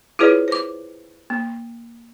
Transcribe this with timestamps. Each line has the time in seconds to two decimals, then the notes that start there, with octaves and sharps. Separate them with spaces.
0.19 E4 F4 G#4 B4 C#5 D5
0.48 C5 D6
1.30 A#3